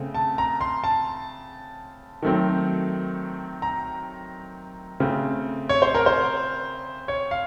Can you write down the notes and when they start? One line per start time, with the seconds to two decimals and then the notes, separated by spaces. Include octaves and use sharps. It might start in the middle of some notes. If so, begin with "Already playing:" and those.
Already playing: C#3 A3 C4
0.15 A5
0.38 A#5
0.61 C6
0.84 A5
2.22 D#3 F#3 A3 C4
3.62 A#5
5.00 C#3 A3 C4
5.69 C#5
5.82 C5
5.95 A#4
6.06 C5
7.08 C#5
7.31 F5